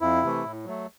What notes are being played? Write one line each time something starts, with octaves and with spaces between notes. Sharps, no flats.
F2 E4
C3 E3 A3
A2
F#3 A3